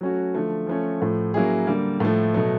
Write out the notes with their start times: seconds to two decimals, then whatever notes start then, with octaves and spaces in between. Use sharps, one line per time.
0.01 F#3 A3 C#4 F#4
0.34 D3 F3 A3
0.67 F3 A3 C#4
1.00 A2 F3 A3
1.34 F#3 A#3 C#4 E4 G#4
1.67 D3 G3 A#3
2.00 A2 F3 A3
2.34 B2 F#3 A3